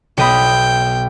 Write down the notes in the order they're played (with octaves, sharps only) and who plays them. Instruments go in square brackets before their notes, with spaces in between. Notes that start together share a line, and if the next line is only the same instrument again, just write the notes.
[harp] B1 D#5 B5 [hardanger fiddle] G5